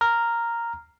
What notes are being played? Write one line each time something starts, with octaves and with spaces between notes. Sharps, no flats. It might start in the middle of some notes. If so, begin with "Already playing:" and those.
A#5 F6